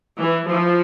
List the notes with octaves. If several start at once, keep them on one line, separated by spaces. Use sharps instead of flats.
E3
F3